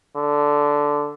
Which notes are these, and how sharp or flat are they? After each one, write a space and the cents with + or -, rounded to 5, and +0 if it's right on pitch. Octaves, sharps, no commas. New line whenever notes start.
D3 -5